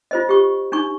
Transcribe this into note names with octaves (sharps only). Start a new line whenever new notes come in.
F4 C5 D#5
G4 C#6
D4 D#4 C#6